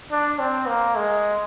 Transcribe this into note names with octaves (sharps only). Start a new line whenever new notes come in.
D4
C4
A#3
G#3